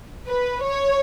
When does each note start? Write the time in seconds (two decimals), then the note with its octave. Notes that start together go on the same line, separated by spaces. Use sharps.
0.26 B4
0.63 C#5